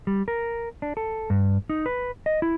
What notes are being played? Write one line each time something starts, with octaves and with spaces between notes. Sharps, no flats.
G3
A#4
D4
A4
G2
D#4
B4
D#5
E4